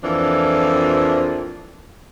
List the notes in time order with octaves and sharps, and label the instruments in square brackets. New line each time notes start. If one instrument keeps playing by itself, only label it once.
[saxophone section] F2 E3 F3 A#3 D4